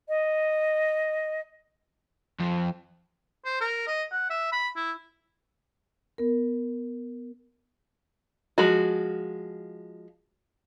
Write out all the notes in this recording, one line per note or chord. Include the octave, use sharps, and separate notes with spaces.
D#5
F2
C5
A#4
D#5
F#5
E5
B5
E4
B3 A#4
F3 G#3 F#4